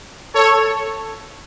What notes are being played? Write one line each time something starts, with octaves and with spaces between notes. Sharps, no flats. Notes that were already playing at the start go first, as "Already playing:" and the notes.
A4 C#5